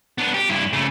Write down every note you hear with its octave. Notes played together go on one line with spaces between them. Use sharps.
B3 D4
G4
G2 E4
C#3 A3